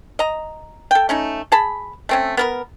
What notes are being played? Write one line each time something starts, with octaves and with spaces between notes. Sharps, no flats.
D#5 A#5
A4 G5
A3 C#4 D#4
G#4 A5 B5
A3 C4 C#4
B3 A#4 B4